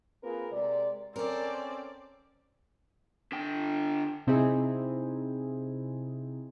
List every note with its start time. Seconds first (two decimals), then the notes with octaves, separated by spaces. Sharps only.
0.23 A#3 C4 F4 G#4 A#4 B4
0.52 C3 G#3 A#4 D5
1.16 C4 C#4 A4 A#4 D5
3.32 D3 G5
4.27 C3 C4 D#4 E4 G#4